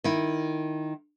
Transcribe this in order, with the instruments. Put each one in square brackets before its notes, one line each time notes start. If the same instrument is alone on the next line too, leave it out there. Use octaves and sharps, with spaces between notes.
[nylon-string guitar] D#3 E4